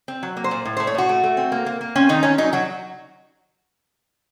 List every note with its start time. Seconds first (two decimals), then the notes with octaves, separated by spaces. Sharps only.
0.08 C4
0.23 F#3
0.37 A#3
0.44 C5
0.51 A#2
0.65 A2
0.77 C5
0.80 A3
0.87 C#5
0.95 A2 F#4
1.09 A3
1.24 A3
1.37 C4
1.52 A#3
1.66 A#3
1.81 A#3
1.95 C4 C#4
2.09 D#3 D#4
2.23 D#3 C#4
2.38 F#3 D#4
2.53 F#3 F#4